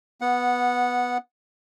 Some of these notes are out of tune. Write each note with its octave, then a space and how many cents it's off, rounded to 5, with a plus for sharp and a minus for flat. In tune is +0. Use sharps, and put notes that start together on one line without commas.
B3 +0 F#5 -10